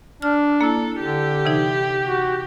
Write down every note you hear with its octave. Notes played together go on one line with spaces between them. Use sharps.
D4 F6
A#3 E4 A4
D3 G4
C3 E3 D#4
F#4